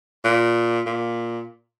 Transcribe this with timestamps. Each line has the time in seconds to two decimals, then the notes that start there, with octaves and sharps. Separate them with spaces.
0.25 A#2
0.86 A#2